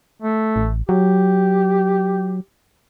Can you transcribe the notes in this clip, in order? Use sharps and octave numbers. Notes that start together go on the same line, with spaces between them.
A3
A1
F#3 G4